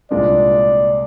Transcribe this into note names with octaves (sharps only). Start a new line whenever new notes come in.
C2 A#2 G#3 D4 F4 D5